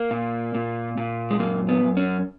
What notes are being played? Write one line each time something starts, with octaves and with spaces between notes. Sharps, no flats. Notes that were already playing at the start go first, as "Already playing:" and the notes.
Already playing: A#3
A#2
A#2
A#2
G#3
F#2 A#3
B3
F#2
C#4